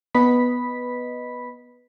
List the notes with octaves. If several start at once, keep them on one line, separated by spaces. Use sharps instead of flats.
B3 B4 D#5 B5 B6